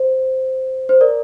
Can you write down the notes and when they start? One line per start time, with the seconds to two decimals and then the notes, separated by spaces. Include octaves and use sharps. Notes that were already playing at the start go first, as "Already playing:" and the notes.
Already playing: C5
0.89 C5
1.01 A#4 D5